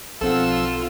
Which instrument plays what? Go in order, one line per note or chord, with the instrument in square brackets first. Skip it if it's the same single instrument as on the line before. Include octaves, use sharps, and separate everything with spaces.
[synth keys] B1 C4 F#5 [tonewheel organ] F3 E6 [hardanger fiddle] F4 [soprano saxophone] A4